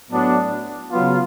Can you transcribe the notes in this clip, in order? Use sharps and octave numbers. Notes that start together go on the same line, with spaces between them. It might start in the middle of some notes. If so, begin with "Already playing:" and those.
A2 F#3 B3 D4
C#3 F#3 B3 F4